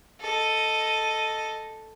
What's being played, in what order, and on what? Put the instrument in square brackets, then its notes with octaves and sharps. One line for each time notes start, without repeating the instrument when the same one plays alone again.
[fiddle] A4 D#5